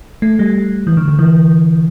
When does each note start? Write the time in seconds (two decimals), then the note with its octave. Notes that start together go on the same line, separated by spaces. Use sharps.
0.22 A3
0.39 G3
0.87 E3
0.97 D3
1.08 D3
1.19 E3